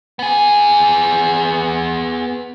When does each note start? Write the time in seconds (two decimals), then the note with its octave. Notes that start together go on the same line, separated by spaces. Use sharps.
0.19 B3 G#4